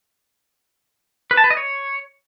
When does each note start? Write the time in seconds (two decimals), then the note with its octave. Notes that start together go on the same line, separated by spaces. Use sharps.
1.31 B4
1.37 A5
1.44 B4
1.50 D#5
1.57 C#5